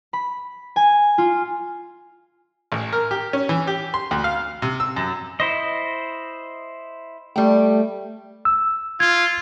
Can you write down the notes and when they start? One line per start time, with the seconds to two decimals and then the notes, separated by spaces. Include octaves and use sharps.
0.13 B5
0.76 G#5
1.18 F4
2.72 A1
2.93 A#4
3.11 G4
3.33 C#4
3.49 E3
3.67 G4
3.94 C6
4.11 D2
4.24 F5
4.62 C3
4.80 E6
4.96 F#2
5.40 E4 C5 D#5
7.36 G3 A3 G5
8.45 E6
9.00 F4 G#6